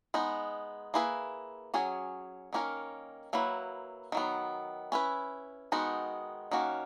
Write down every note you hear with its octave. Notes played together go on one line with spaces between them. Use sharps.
G#3 B3 D#4
A#3 E4 G#4 B4
F#3 C#4 G#4
D#3 A#3 C#4 F#4 A#4
F#3 A#3 E4 B4
D#3 F#3 B3
C#4 E4 B4
D#3 G#3 B3 D#4 F#4
D#3 A#3 C#4 F#4